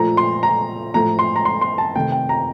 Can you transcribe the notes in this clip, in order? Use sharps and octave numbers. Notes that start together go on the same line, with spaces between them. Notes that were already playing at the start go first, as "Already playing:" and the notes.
Already playing: A#2 F3 A3 A#5
C6
A#5
A2 F3 A3 A#5
C6
A#5
C6
C6
A5
C3 D#3 A3 G5
G5
A#5